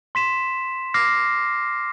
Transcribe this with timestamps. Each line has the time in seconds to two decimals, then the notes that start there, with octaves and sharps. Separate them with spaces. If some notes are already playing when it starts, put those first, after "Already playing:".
0.15 C6 B6 E7
0.94 D6 F6 A#6 C7